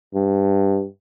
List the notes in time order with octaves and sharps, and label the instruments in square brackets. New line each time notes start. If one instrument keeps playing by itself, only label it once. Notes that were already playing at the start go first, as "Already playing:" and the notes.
[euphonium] G2